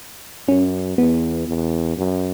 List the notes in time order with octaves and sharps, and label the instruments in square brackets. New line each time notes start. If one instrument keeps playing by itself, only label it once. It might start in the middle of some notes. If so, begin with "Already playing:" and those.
[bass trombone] F#2 [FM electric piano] C#4
[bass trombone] E2 [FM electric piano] B3
[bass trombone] E2
F#2